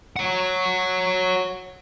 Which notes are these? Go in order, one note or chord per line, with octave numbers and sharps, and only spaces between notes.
C#5 F#5